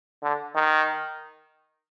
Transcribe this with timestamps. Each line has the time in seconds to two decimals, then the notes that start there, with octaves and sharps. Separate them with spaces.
0.23 D3
0.55 D#3